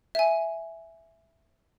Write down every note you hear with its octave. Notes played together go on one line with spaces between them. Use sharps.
E5 G#5